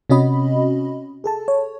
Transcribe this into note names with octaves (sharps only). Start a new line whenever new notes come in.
C3 C#4 F#4 D#5 B5
G#4 A4 A5
C#5